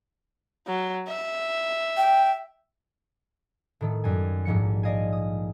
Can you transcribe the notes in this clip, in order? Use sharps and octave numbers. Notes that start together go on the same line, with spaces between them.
F#3
E5
G5
A2 D#3 A3
F#2 G3 G#5
A#1 G#2 F3 C#7
D5 D#5 F5 G#5
D#6